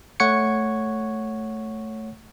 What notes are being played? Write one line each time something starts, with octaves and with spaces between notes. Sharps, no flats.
A3 C#5 F#5 C#6 G#6 C#7